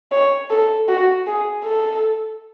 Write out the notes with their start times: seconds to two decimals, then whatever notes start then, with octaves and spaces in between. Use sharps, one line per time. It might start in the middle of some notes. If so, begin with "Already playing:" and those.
0.12 C#5
0.50 A4
0.88 F#4
1.27 G#4
1.64 A4